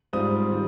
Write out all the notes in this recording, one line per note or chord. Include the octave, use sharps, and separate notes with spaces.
G#2 G3 C4 F4 D#6
D#3 G3